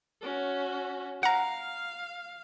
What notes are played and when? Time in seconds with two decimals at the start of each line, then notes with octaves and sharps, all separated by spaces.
0.22 C#4 F#4
1.23 F5 F#5 A#5